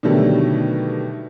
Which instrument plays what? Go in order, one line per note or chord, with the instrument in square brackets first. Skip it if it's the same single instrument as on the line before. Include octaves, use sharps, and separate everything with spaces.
[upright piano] B2 D3 D#3 F#3 G3 A3